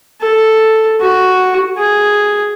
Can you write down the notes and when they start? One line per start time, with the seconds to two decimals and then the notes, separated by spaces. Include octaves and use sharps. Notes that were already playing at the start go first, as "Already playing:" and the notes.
0.21 A4
1.01 F#4
1.78 G#4